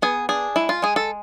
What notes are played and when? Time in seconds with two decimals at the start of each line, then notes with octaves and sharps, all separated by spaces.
0.02 B3 G#4
0.29 D4 G#4
0.56 G#3 E4
0.69 F4
0.82 G#3 G#4
0.96 A4